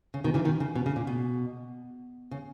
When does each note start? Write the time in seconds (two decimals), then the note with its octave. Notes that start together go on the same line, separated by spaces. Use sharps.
0.14 C#3
0.24 B2 D#3
0.34 C#3 E3
0.45 B2 D#3
0.60 C#3
0.76 B2
0.86 C#3
0.96 A#2
1.07 B2
2.31 C#3